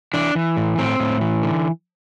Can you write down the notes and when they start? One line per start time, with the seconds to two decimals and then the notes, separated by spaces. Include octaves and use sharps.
0.13 E3 D4
0.35 E3
0.57 A2
0.78 A2 C4
1.00 A2
1.21 E3
1.43 D3